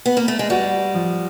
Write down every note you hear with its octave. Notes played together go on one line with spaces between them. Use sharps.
B3
A#3
A3
G#3
G3 F#4
F3